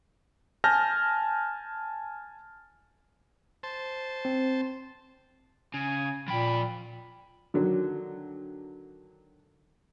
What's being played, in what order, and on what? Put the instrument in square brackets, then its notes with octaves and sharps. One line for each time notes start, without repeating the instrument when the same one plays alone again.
[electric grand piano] G#5 A5 F6 G6 A#6
[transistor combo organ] C5 A5
[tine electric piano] C4
[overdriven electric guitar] C#3 [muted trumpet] G#5
[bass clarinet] A#2 [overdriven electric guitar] F3 G5 [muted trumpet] B5
[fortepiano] D3 D#3 F#3